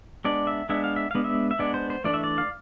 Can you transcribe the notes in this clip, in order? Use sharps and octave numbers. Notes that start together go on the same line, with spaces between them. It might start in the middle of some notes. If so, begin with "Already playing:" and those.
G#3 B3 D4 D5
E5
G#3 B3 D4 E5
F5
E5
G#3 B3 D4 F5
E5
E5
G#3 B3 D4 D5
C5
C5
E3 A3 D4 D5
E5
D5
F5